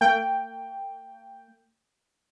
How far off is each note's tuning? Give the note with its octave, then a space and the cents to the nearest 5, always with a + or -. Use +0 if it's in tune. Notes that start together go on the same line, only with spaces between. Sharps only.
A#3 -45 G5 +0